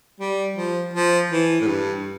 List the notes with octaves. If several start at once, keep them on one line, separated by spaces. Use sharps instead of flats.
G3
F3
F3
E3
A2
G2